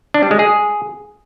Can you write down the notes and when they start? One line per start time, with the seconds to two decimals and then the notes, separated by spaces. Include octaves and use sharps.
0.14 D4
0.23 G3
0.31 G#3
0.39 G#4